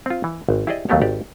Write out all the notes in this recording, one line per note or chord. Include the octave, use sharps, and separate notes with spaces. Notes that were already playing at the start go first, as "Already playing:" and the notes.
C4 F4
E3
G#1
E4 G4 G#4 C5 D5 D#5
D#2 F#3 A3 B3 G4 C#5
G#1 G4 D5